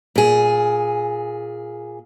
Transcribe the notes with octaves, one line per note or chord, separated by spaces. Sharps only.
A#2 G#4